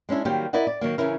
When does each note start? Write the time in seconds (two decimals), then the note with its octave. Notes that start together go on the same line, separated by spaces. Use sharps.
0.09 G#3 C#4 D4 E4
0.25 D#3 F#3 G3 A#3 G4 C5
0.53 E4 A#4 D5 D#5 F#5
0.67 D5
0.81 D#3 F#3 A#3
0.98 C#3 E3 C#4 E4 A#4